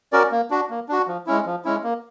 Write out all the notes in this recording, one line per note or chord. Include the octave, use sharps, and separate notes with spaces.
C#4 F#4 A#4 D5
A#3
D4 F#4
A#3
D4 F#4
F3
G#3 C#4 E4
F3
G#3 C#4 E4
A#3